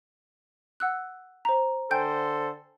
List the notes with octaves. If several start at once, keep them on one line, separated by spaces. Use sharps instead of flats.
F#5 E6 F#6
C5 A#5
D3 A4 C5 G5 G#5 G6